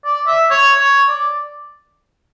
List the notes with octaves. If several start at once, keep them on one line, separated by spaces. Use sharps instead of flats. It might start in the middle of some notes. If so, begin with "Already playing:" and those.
D5
E5
C#5
C#5
D5